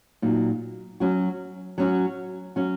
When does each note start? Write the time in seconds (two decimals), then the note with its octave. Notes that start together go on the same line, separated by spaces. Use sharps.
0.22 A#2 F#3 D#4 F#4
1.00 F#3 C#4 F#4
1.78 F#3 C#4 F#4
2.56 F#3 C#4 F#4